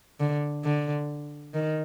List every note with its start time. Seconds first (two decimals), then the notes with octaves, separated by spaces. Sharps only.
0.20 D3
0.64 D3
1.54 D#3